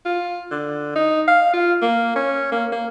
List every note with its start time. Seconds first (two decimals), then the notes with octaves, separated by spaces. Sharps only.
0.05 F4
0.51 D3
0.95 D#4
1.27 F5
1.53 F4
1.82 A#3
2.16 C#4
2.52 A#3
2.72 A#3